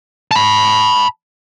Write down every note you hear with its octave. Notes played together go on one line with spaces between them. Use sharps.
A5 B5